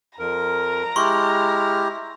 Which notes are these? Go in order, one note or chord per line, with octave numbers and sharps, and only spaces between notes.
F2 A#4 A#5
G#3 E4 G4 C6 C#6 F6